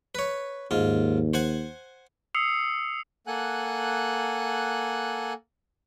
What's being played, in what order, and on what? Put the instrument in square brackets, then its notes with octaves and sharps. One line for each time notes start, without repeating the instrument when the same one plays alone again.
[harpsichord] B4 C#5
[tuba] D#2 [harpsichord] G#2 F4
[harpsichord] C5 F#5 G#5
[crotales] D#6 E6 C7 C#7 F7
[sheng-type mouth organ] A#3 A4 F#5 G#5 F#6